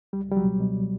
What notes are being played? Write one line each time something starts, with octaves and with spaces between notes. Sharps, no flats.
C#2 G3
C#2 G3
F#3
B2
B2